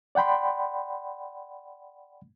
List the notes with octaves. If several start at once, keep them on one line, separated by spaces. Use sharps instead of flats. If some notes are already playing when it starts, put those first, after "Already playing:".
D5 F#5 G5 B5 C6